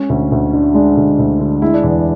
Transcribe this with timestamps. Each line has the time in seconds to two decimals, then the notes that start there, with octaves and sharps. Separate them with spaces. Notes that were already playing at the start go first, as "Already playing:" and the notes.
Already playing: G#3 C#4
0.09 D2
0.32 D2
0.53 D3
0.74 G#3 D4
0.97 D2
1.19 D2
1.40 D3
1.62 G#3 E4
1.74 D4
1.83 E2 E4